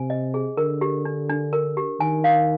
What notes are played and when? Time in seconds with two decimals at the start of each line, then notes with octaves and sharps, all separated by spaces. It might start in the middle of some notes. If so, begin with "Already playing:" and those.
Already playing: C3 G#5
0.10 D#5
0.34 G#4
0.57 D3 A#4
0.81 G4
1.05 D4
1.29 D4
1.53 A#4
1.77 G4
2.00 D#3 G#5
2.24 F5